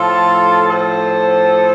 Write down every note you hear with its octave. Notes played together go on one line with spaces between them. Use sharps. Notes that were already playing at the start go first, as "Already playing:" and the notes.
Already playing: A2 F3 F4 A4
A4 C5